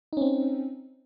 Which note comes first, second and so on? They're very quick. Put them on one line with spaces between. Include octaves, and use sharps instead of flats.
D#4 C#4 C4